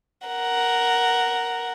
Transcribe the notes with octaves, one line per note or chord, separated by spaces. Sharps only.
A#4 F#5